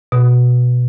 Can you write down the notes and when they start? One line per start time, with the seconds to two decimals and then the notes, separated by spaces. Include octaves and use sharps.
0.12 B2